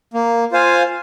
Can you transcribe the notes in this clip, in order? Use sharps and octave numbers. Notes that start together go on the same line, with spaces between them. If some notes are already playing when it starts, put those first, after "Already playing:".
A#3
F4 C5 F5 G#5